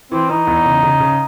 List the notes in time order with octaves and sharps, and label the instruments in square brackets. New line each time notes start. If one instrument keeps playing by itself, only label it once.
[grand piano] E3 [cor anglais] C4
[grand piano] E3 [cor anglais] D#4
[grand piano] E2
C#3
C#3
C#3